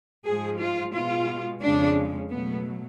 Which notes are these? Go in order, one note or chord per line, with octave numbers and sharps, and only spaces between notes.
G#2 F3 G#3 G#4
F4
B2 G#3 F4
F2 C#3 G#3 D4
B2 F#3 A3 B3